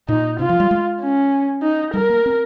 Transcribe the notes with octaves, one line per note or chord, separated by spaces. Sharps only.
A#2 D#4
C3 F4
F3
G3
G#3
C#4
D#4
G3 A#4
A#3
C4